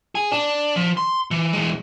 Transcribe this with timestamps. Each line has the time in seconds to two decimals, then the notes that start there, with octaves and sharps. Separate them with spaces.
0.15 G#4
0.31 D4
0.76 F3
0.97 C6
1.31 E3
1.53 E3 G#3